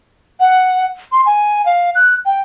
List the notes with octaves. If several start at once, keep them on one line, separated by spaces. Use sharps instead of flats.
F#5
C6
G#5
F5
F#6
G5